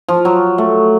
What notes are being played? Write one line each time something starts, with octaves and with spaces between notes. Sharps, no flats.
F3
F#3
A3